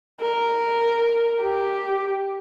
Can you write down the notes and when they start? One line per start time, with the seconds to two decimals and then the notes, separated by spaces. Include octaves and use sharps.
0.21 A#4
1.40 G4